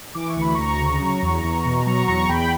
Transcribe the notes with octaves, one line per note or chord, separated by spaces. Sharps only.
E3 D6
C#6
D2 B5
D2 A#5 C#6
C#3
F#3
E2
E2
B2
F#3 A#5 C#6
E2 A#5 C#6
E2 G5 B5